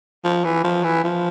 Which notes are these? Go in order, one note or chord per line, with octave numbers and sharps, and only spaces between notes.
F3
E3
F3
E3
F3